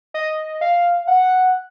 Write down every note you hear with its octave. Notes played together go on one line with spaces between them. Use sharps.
D#5
F5
F#5